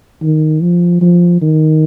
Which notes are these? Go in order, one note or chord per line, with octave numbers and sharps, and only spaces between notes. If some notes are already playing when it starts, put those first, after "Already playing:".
D#3
F3
F3
D#3